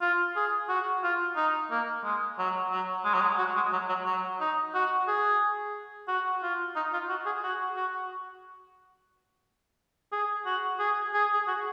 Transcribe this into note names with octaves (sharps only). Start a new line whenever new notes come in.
F4
G#4
F#4
F4
D#4
A#3
G#3
F#3
F#3
G#3
F#3
G#3
F#4
G#3
F#3
F#3
F#3
D#4
F#4
G#4
F#4
F4
D#4
F4
F#4
G#4
F#4
F#4
G#4
F#4
G#4
G#4
G#4
F#4